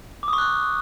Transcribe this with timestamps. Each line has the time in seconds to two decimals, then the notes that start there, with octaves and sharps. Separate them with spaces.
0.23 D6
0.28 D#6
0.33 C#6
0.38 F#6